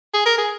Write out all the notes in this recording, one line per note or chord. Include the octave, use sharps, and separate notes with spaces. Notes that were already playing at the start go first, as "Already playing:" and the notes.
G#4
A#4
G#4